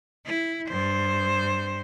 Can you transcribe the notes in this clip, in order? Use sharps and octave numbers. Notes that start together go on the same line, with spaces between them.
E4
G2 C5